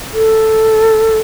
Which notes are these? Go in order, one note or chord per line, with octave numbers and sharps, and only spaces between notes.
A4